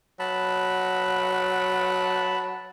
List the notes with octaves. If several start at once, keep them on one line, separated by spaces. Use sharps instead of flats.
F#3 A5 B5